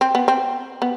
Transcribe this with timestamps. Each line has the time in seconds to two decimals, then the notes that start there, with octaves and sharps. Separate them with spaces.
0.01 C4
0.15 B3
0.28 C4
0.82 B3